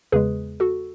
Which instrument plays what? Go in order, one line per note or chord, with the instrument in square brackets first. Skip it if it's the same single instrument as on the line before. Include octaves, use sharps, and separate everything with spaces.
[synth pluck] E2 C#3 G#3 G#4 B4
F#4 A4